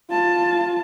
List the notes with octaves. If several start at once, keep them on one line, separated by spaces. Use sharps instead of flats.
F4 A5